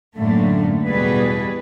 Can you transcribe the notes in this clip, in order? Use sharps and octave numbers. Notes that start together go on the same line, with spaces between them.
F#2 A2 D3 A3 A#3
E2 B2 G3 G#4 B4